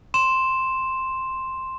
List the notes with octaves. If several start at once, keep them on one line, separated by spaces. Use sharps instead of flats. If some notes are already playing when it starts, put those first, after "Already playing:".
C6 E7